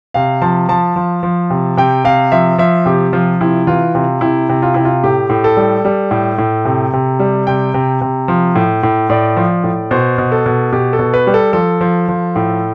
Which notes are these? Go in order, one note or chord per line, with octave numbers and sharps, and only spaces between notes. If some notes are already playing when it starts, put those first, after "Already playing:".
C3 F5
F3 A5
F3 A5
F3
F3
C3
C3 G5
C3 F5
F3 E5
F3 E5
C3 G4
F3 F4
C3 E4
E3 F4
C3 F4
C3 E4
C3
F4
C3 E4
F4
A2 G4
A2
A4
G3
G3
A2
A2
C3
C3
G3
C3 G5
C3
C3
F3
A2
A2
A2 D5
F3
A2
B2 C5
B2
A4
B2
B2 G4
A4
B2
B4
G3
A4
F3 A4
F3
F3
A2